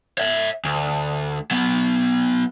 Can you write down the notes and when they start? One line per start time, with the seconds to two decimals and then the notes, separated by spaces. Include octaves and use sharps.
0.18 C#5 E5
0.65 D2
1.51 F#3 B3